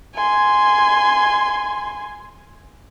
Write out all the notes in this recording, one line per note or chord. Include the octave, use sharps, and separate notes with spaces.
G#5 C6